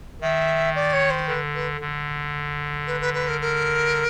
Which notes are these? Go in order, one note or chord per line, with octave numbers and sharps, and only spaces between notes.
D#3 E5
D5
C#5
C5
D3 B4
B4
D3
B4
B4
B4
A#4
A#4